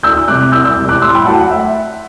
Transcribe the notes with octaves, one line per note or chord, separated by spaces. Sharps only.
D2 E6 G6
C3 G3 D6 F#6
C2 E6 G6
E6 G6
C3 G3
D6 F#6
A2 C6 E6
G5 B5
F#3 A3 F#5 A5
F#5
E5